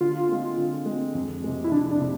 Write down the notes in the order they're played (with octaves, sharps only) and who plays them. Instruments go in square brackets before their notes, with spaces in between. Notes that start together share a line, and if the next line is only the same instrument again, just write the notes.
[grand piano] D3 [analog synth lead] F4
[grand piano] G#3 C4
D3
G#3
C4
F2
C3 G#3
[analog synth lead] E4
[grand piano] F2 [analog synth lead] D4
[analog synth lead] D4
[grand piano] C3